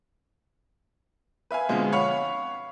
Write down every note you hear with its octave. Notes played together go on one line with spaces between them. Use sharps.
B4 E5 F5 G#5
D2 B2 F3 G#3 C4
C#5 F5 F#5 B5 C#6